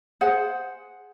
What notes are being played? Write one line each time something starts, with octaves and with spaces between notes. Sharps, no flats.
G#4 C5 F#5